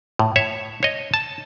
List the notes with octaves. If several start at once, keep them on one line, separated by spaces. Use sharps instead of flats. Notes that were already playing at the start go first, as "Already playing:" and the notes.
A2
C#5 E5
C#5 D#5
A5